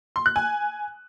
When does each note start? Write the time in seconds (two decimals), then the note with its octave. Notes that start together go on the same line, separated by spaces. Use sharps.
0.16 C6
0.26 F#6
0.36 G#5